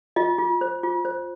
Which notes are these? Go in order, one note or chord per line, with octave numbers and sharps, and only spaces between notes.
F4 D#5
F4
C5
F4
C5